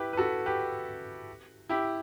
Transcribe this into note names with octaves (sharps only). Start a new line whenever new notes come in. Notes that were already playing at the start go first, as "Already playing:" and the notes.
Already playing: E4 G4 B4
B4
F#4 A4
G4 B4
E4 G4